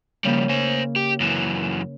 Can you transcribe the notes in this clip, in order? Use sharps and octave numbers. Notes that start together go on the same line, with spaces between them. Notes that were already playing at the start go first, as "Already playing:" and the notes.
C#3 F3 G3 A#3
C5 G#5
G4
F#2 E3